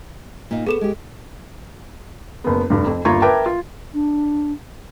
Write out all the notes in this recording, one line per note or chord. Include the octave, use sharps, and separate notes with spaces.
A#2 D#4
B3 G#4 A4 E7
G#3 G4
F#1 B3
F1 G2
F2
G1 D#2 F4 A#5 C#6 G#6
A#4 B4 E5 G5 A5 D6
F4
D4